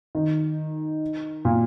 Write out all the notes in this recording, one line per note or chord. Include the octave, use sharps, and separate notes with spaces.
D#3
A#2